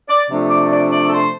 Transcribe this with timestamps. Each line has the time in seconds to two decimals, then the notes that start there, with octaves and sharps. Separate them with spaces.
0.08 D5
0.29 C3 F3 A3 D4
0.50 D5
0.71 D5
0.91 D5
1.07 A4
1.12 C5